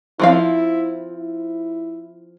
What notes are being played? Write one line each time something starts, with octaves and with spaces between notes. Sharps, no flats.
F3 C4 E4 F5
E4